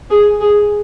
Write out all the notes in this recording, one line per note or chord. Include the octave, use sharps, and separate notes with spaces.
G#4
G#4